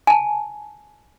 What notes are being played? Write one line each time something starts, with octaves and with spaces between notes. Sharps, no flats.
G#5 A5